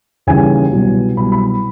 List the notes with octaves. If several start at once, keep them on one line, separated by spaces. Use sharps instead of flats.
D#2 C#3 E3 G3 G#5
C2 B2 F#3
C2 B2 F#3 B5
B5